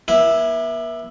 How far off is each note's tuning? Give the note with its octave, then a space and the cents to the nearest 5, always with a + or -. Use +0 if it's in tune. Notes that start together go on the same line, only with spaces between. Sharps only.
A#3 +45 E4 +0